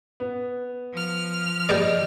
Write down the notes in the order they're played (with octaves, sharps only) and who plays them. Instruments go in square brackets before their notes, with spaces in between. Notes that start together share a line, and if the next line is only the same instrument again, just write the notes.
[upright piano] B3
[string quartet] F3 F6
[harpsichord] G4 B4 D5 [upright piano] D#5